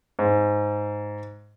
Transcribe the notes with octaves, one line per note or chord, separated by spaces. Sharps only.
G#2